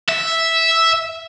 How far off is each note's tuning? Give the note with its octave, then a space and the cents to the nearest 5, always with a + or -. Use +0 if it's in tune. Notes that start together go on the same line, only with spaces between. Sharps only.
E5 -5